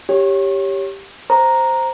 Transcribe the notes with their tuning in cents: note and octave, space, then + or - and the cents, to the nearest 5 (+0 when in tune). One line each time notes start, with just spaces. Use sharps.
G4 +0 C#5 +0
C5 +0 A#5 +0